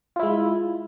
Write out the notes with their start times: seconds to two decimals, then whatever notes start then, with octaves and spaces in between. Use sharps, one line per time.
0.16 F4
0.19 E4
0.23 G#3